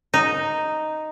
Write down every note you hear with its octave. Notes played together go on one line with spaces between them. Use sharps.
D#4